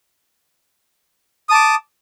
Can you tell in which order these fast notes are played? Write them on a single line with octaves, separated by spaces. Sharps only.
D#6 A5 D6